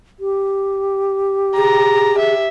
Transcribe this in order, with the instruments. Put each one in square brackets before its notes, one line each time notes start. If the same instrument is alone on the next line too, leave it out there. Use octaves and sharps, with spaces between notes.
[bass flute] G4
[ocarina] G#4 [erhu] A#5
[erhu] E5